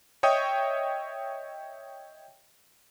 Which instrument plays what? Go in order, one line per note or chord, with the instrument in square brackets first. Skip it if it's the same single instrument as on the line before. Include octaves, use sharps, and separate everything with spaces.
[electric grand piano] C#5 D#5 E5 G5 C#6 D#6